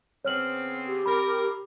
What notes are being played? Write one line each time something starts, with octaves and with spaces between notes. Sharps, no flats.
C#3 B3 C4 C#5 F6 F#7
G4
C3 C4 A#4 B5